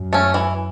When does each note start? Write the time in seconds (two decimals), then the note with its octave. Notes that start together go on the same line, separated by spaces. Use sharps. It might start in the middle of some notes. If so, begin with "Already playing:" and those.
Already playing: F#2
0.13 A3 C#4
0.34 E3